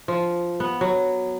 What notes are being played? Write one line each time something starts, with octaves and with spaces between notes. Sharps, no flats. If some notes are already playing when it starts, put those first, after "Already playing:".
F3
B3
F#3